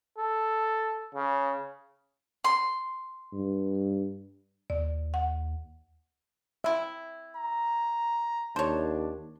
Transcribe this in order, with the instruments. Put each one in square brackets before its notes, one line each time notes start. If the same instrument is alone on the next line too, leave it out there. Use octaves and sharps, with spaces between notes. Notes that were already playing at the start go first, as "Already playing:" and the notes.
[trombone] A4
C#3
[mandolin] C6
[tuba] G2
[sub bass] D#2 [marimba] D5
[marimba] F#5
[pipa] C4 E4 [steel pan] E5
[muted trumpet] A#5
[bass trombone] D#2 [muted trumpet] D4 [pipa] C5 C#5 [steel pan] A5